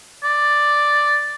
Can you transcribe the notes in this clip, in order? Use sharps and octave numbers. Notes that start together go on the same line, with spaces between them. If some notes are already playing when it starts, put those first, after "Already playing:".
D5